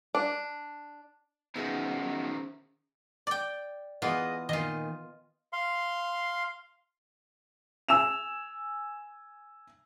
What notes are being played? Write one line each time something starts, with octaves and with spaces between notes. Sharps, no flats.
D4
D#3 F3 B3 C#4 D#4 F#4 G#4 E5
D5 G5
E3 B3 F4 G#4 D#5
A#2 D#3 F4 D#5
F5 C6
G#5 E6 E7 F7